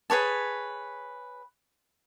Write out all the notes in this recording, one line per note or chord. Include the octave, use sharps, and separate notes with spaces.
G#4 B4 C#5 A5